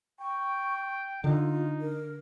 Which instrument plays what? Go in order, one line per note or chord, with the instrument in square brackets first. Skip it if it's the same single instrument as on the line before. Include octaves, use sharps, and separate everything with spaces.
[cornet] G5 [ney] C#6
[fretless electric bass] D3 [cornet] D#4 [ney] F4
[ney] A#4